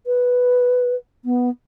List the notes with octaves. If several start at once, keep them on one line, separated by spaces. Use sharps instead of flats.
B4
B3